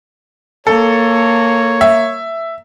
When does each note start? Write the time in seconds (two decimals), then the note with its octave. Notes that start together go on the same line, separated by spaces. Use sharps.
0.67 A#3 A4 C#5
1.81 E5